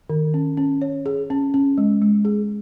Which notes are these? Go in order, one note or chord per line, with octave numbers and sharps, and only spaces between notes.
D#3
C#4
C#4
C#5
G#4
C#4
C#4
G#3
G#3
G#4